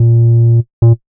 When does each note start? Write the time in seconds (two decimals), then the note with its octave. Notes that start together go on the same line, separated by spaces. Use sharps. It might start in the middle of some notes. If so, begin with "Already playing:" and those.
Already playing: A#2
0.82 A#2